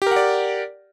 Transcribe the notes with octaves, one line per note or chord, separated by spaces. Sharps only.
G4 A#4 D5 F#5